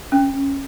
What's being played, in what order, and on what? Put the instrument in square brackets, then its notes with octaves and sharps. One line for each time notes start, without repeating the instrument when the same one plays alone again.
[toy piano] C#4